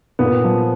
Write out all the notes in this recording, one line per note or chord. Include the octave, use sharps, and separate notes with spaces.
A#2 B3
F3